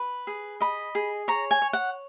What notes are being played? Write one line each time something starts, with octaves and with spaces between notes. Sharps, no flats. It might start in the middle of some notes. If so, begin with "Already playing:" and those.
Already playing: B4
G#4
D#5 B5
G#4
C#5 A#5
G#5
C#5
F#5